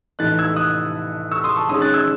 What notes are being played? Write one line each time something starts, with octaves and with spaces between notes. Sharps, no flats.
A2 E3 A3 D#4 F#6 A6
E6 G#6
D#6 F#6
C#6 E6
C6 D#6
A5 C#6
D#3 G#3 C#4 C6 D#6
F#6 A6
E6 G#6